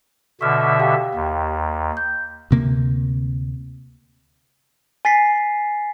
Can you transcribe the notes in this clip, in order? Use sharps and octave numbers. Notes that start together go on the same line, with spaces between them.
B2 D3 E5 C#6 F6
G4 F5 G5
D#2
G6
D2 C3 A#3
G#5 A6 B6 C7